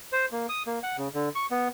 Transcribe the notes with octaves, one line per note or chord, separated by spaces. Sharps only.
C5
A#3
D#6
A#3
F#5
C#3
D3
C#6
B3